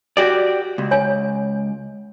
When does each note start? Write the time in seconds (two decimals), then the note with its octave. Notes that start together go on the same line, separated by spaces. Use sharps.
0.17 F#4 G4 D5
0.78 C#2
0.91 C#5 G#5